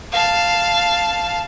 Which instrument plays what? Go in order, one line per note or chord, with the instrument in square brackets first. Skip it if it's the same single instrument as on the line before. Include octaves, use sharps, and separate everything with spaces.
[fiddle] F5 A5